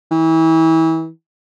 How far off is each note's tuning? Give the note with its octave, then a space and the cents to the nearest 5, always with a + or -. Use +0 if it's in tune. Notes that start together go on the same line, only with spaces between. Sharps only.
E3 -30